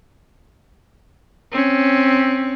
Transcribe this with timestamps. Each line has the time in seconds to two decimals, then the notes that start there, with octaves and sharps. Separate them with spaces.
1.52 C4 C#4